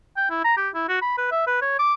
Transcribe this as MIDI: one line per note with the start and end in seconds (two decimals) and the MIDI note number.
0.17 0.29 79
0.30 0.41 64
0.44 0.54 82
0.57 0.69 67
0.74 0.86 64
0.89 0.97 66
1.02 1.15 83
1.18 1.31 71
1.31 1.42 76
1.47 1.60 71
1.62 1.76 73
1.79 1.94 86